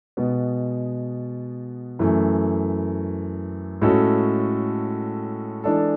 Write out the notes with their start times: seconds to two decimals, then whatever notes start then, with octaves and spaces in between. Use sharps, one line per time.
0.17 B2 G#3 B3
1.99 F#2 E3 A3
3.81 A2 G#3 C#4 F#4 A4
5.64 E3 G#3 D4 A4